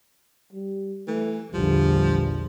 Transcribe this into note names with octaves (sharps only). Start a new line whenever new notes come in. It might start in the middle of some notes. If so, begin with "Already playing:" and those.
G3
E3 A3
A#1 E2 D3 F3 G3